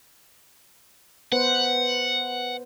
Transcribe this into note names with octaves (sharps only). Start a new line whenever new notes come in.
B3 B4 C5 F#5